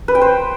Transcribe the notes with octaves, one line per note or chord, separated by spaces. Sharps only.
B4
G5
C5